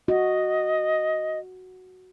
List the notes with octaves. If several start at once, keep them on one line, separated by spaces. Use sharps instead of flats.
F#4 D#5